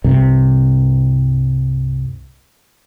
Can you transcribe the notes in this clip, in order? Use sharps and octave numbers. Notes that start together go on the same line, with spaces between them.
C2 G2 C3